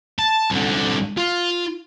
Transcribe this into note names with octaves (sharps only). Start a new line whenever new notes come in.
A5
C2 D3
F4